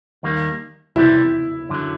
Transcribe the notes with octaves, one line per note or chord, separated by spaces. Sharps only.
D#2 D#3 G3 A#3
C2 C3 E3 G3 E4
F#2 D3 F#3